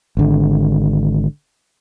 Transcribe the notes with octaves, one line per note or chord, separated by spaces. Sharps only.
G#1 D3